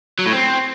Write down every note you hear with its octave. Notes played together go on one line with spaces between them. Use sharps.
F#3
A2
C4